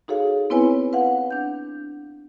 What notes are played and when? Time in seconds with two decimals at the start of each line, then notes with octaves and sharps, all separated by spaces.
0.08 D#4 F#4 G#4 A4 C#5 F5
0.50 B3 C4 E4 B4 C#5 G#5
0.93 B4 F5 F#5
1.31 D4 G6